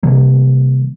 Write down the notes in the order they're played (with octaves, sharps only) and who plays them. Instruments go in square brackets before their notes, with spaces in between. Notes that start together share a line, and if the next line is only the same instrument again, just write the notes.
[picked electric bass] C3 D#3 G3 A#3